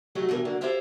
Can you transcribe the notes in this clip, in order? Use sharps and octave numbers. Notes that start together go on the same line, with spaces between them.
F#3 A3 D#4 F#4 G4
G2 B2 E3 A#4 B4
D3 F#3 A#3
E4 G4 A4 C5 E5 F5